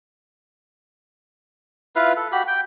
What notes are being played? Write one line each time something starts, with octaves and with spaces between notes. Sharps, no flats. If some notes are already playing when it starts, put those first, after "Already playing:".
E4 F4 B4 F5
A4
F#4 G4 B5
G5